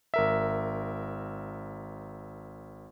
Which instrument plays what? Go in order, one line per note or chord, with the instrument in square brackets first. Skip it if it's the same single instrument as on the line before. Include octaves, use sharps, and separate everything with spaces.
[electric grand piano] G#1 A#4 E5